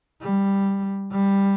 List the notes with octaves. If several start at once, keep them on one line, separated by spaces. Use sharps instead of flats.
G3
G3